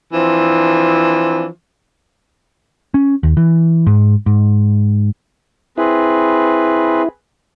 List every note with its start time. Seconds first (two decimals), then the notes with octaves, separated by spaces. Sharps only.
0.13 E3 F3 C4 D4
2.94 C#4
3.23 D#2
3.37 E3
3.87 G#2
4.26 G#2
5.78 C4 E4 G#4 B4